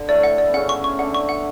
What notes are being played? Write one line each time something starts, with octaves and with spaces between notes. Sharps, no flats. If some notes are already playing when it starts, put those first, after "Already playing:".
Already playing: D3
A2 A3 D5
F#5
D5
B3
C#3 C#4 F#5
C#6
C#6
D3 D4 F#5
C#6
F#5